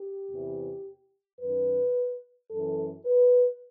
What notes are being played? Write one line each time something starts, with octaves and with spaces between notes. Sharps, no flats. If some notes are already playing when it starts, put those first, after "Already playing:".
Already playing: G4
E2 C3 E3
F#2 D#3 B4
F#2 E3 A4
B4